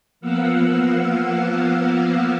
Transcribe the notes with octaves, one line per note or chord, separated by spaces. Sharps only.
F3 A#3 B3 F5 F#5 E6